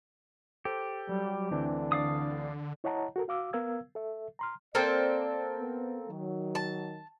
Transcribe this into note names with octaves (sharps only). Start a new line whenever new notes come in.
G4 A4 C5
F#3 G3
D2 D3 E3 C4 D4
D5 F5 D#6
E4 C#5 D#5 F#5 A5 A#5
F#4 A4 A#4
F#4 F5 D6 E6
B3 A#4 F5 E6 G#6
A4 E5
A#5 C6 F6
A#3 C4 A4 D5
B3
D#3 F#3
A5